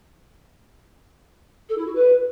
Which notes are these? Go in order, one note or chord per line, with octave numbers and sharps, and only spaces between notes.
A4
E4
F#4
B4